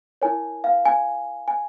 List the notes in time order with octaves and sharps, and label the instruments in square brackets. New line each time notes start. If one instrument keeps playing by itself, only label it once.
[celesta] E4 A#4 C#5 G#5
F5
G#5
G#5